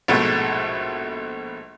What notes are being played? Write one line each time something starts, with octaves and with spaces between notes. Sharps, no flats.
A#1 G#2 B2 A3 A4